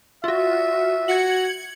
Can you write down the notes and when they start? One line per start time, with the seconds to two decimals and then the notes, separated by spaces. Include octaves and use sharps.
0.24 F4 F#4 E5
1.08 F#4 G#6 C#7 F#7